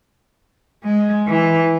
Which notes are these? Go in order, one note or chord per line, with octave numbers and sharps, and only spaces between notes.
G#3
E3